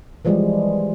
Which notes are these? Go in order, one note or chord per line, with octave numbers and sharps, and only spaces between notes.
E3 F3 G3 G#3